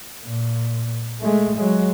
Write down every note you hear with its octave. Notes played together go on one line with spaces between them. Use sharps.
A#2
G#3 A3
F#3 G#3